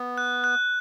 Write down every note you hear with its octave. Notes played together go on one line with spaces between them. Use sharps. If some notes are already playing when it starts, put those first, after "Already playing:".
Already playing: B3
F#6
F#6